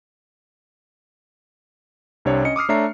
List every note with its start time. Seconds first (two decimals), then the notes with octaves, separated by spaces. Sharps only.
2.25 C2 C3 D4 C#5
2.45 C#4 D#5 C#7
2.56 D6 D#6 F6 C7
2.69 A3 D4 C#5 E5 A#5 C7